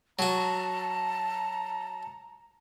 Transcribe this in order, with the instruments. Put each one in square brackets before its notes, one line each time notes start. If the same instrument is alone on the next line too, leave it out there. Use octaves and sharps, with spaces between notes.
[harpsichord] F#3 F#4 [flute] A5 [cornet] A#5